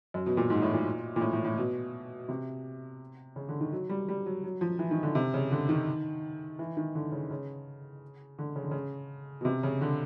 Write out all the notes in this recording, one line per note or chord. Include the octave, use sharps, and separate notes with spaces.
F#2
B2
A#2
G#2
A2
A#2
A#2
A2
A2
A2
B2
C3
C#3
D3
D#3
F#3
G3
G3
F#3
F#3
F3
E3
D#3
D3
C3
C#3
D3
D#3
E3
D#3
D3
C#3
C#3
D3
C#3
D3
C#3
B2
C3
C#3
D3